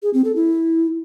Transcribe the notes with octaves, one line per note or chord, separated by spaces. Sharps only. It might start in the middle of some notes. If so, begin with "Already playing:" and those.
G#4
C4
A4
E4